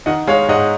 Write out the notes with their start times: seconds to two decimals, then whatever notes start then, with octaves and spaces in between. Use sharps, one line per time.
0.06 D#3 D#5 F#5
0.27 G#3 C#5 F5
0.48 G#2 D#5 F#5